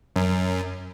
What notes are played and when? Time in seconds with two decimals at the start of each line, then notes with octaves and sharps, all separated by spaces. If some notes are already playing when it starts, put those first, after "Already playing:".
0.16 F#2